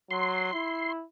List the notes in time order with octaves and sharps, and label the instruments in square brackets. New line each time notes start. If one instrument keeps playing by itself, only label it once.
[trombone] F#3 [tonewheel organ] C6
[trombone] E4